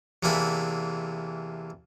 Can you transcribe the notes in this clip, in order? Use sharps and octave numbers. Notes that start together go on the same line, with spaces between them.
E2 C3 E3 A#3 D4 B5